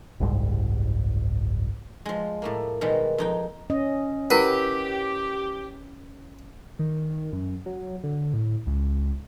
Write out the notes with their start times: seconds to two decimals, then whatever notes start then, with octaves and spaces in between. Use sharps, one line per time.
0.20 F#1 C2 G#2 G3
2.05 F3 G#3
2.42 A2 A3 A#3
2.81 B2 D#3 G3 G#3
3.18 F2 D#4 G5
3.70 C#4 D#5
4.30 E4 G4 A#4 B4 F#5
6.79 D#3
7.33 F#2
7.66 F#3
8.04 D3
8.34 A2
8.67 C#2